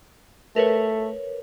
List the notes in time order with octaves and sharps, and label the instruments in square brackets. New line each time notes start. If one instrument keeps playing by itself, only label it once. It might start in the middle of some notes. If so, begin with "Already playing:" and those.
[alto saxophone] A3 [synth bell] A#4 B4 C#5